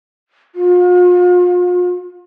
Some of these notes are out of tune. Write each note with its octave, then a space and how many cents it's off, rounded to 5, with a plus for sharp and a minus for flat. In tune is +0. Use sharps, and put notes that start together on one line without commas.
F4 +40